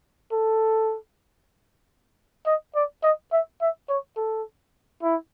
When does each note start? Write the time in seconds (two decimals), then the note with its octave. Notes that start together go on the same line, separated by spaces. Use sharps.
0.32 A4
2.46 D#5
2.75 D5
3.03 D#5
3.32 E5
3.61 E5
3.89 C#5
4.17 A4
5.02 E4